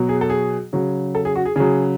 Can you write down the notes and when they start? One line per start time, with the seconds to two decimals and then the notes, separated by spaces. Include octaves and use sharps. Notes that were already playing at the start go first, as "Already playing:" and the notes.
Already playing: B2 F#3
0.09 G#4
0.21 A4
0.30 G#4
0.73 C#3 F#3
1.15 A4
1.25 G#4
1.36 F#4
1.45 G#4
1.56 C#3 F#3 G#4